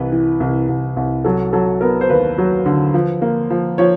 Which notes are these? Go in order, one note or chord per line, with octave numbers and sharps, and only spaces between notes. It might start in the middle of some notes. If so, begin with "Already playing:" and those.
Already playing: C2 E3 B4
E3
C2
C2
C2
F#3 A4
F#3 A4
B3 A#4
C5
D#2 B4
F#3
D3
F3
A#3
F3
F3 C#5